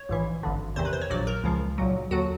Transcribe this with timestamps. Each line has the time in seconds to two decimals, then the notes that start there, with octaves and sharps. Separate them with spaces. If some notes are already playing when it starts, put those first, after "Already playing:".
Already playing: C#5
0.09 A#1 G#2 E3
0.43 G#1 G2 D3
0.76 E2 C3 D#3 C5
0.85 B4
0.93 C5
1.01 C#5
1.10 A#1 A#2 F#3 D5
1.27 A#4
1.44 C#2 C#3 F3
1.78 B1 A#2 F#3
2.11 D#2 D3 F#3 F#4